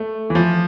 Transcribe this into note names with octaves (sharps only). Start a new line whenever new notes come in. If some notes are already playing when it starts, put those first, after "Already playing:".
Already playing: A3
E3
F3